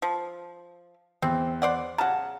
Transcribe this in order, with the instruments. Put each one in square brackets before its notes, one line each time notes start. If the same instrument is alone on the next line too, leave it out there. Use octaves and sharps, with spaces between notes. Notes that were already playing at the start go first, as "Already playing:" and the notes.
[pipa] F3
[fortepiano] E2 [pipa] C4
[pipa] C5 D5 F#5
[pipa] C#3 F#3 [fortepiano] F#5 A5